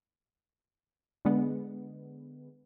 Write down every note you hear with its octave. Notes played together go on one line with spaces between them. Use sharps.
D3 G#3 B3